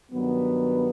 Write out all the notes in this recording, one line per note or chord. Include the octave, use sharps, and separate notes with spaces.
G2 D#3 F#3 B3